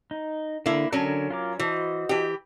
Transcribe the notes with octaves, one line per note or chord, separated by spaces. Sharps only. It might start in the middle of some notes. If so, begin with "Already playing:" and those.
D#4
D3 A#3 E4
D3 F#3 C#4 A#4
F4 A#4 D6
E3 F#4 C5 D#5
E3 G4